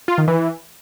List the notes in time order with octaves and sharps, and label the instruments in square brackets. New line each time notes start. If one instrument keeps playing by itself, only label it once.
[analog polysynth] F4
D#3
E3